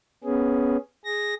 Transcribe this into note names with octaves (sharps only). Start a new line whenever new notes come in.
B3 C#4 G#4
G#4 A#6